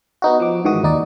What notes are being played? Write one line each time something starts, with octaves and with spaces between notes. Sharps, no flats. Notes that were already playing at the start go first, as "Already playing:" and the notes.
B3 D#4 F#4
F3 D6
G#2 D#3 E3 F#4 D#6
D#2 D#4 D5